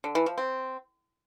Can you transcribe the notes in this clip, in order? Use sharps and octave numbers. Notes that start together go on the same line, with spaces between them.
D3
E3
F3
C4